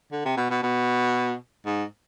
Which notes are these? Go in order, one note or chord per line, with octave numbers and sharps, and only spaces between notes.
D3
C3
B2
B2
B2
G#2